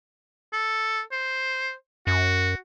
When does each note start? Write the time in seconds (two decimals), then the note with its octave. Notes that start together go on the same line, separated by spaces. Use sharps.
0.53 A4
1.12 C5
2.07 F#2 F#4